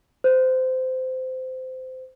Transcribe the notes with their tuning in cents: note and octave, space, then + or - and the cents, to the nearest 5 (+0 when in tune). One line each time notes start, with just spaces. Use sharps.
C5 -20